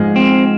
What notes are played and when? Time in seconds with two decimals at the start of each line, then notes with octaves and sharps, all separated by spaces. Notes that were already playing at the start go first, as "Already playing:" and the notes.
Already playing: G#2 F3 G#3
0.16 C4